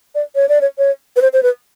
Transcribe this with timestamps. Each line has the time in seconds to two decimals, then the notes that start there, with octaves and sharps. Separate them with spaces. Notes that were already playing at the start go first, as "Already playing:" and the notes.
0.15 D5
0.35 C#5
0.49 D5
0.61 C#5
0.78 C#5
1.16 B4
1.22 C5
1.33 C5
1.43 B4